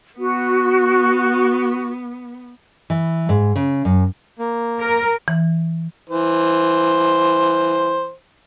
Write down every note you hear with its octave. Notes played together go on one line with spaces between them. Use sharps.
B3 F#4
E3
G#2
C#3
F#2
A#3
A#4
E3
E3 C5